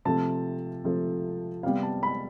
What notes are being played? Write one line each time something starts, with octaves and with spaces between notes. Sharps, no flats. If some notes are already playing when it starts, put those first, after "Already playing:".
C3 F3 A3 A5
C3 F3 A3
C3 G3 B3 F5
A5
B5